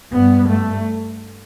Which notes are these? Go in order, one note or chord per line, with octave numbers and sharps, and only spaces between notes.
G2 B3
A3